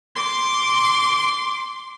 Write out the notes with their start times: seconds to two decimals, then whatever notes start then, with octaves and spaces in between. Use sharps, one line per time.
0.16 C6 D6